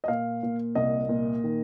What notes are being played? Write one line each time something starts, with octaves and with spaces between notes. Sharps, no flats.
D#5
A#2 F5
A#2
C2 D#5
A#2
D#3